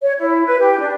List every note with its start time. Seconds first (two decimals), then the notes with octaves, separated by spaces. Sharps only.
0.02 C#5
0.19 E4
0.46 B4
0.59 G4
0.79 D4